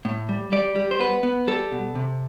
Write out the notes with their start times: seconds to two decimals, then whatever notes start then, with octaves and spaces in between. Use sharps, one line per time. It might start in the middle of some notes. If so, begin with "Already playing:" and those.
0.05 A2
0.29 G3
0.52 G3 D5
0.76 G3
0.91 C5
0.99 B3 B4
1.23 B3
1.47 G3 A4
1.72 B2
1.95 C3